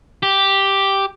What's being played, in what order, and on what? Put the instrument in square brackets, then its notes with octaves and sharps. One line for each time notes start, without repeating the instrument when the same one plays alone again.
[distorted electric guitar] G4